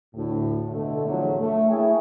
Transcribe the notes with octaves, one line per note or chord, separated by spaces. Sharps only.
D2 A2
B2 D3 A3
E2 A2 D3 F3 F#3
A3
A#3 E4 G#4 C#5 E5 G5